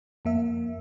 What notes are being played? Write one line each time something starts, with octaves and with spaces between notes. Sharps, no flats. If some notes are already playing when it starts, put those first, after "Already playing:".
F2 A#3 E5